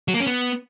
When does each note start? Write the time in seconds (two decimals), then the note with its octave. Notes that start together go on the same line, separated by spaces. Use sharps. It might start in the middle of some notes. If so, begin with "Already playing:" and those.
0.08 F#3
0.14 A#3
0.20 C#4
0.27 B3